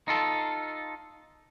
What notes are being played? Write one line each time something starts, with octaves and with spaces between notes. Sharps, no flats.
D#4 F4 A4